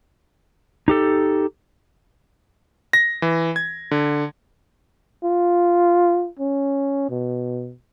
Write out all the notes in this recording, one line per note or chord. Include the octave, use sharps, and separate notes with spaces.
D#4 G4 A4
A#6
E3
G#6
D3
F4
C#4
B2